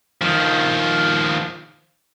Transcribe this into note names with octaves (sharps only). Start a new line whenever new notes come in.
D#3 F3